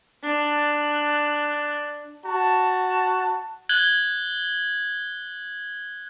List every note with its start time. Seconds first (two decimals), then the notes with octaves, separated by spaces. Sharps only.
0.23 D4 F#6
2.25 F#4 A5
3.69 F#6 G#6 F#7 G7